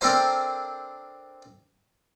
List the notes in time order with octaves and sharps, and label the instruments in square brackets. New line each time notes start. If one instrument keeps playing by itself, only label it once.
[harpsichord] C4 D4 A4 A#4 C5 G#5